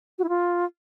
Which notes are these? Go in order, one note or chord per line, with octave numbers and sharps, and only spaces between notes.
F#4
E4
F4